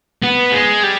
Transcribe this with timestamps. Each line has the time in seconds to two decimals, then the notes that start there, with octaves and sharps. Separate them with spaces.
0.22 B3
0.52 G#3
0.83 G3